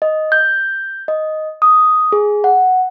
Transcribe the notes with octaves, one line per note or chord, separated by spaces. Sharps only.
D#5
G6
D#5
D#6
G#4
F#5